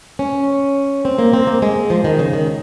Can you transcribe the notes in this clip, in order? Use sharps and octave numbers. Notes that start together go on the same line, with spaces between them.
C#4
C4
A#3
C4
A#3
G#3
F3
D#3
C#3
D#3